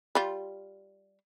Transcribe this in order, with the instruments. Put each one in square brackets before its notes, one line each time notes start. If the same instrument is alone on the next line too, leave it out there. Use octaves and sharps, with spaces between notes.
[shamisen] G3 F4